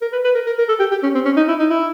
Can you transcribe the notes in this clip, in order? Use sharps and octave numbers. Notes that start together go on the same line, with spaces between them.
A#4
B4
B4
A#4
A#4
A#4
A4
G4
G4
C#4
C4
C#4
D#4
E4
D#4
E4